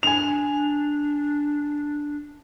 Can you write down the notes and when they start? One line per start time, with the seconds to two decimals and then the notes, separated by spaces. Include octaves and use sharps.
0.03 D4 G#5 F7